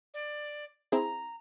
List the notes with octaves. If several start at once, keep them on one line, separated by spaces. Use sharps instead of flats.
D5
C4 E4 G#4 A#5